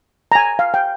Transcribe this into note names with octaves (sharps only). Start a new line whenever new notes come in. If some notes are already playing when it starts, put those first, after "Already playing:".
A#5
G#5
F5
G5